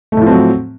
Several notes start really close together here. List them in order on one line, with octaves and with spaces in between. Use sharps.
A3 A2 F3 C4 F#3